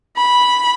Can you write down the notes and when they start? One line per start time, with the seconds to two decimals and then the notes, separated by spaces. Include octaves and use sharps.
0.17 B5